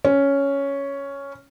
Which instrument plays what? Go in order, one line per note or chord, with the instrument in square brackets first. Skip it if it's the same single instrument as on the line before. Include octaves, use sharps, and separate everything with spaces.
[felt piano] C#4